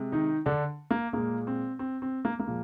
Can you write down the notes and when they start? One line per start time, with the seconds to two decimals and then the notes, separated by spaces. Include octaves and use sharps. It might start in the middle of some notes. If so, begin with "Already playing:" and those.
Already playing: C3 G#3
0.12 D#3 D#4
0.46 D3 D4
0.91 A#3
1.13 A#2 G#3 A#3
1.47 C4
1.79 C4
2.02 C4
2.25 A#3
2.39 A#3
2.46 A#2 F3 G#3